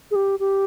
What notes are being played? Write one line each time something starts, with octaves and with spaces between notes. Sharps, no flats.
G#4
G4
G4